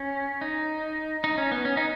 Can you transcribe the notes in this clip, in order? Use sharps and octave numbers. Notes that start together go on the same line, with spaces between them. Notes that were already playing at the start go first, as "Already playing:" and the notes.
Already playing: C#4
D#4
D#4
C#4
B3
C#4
D#4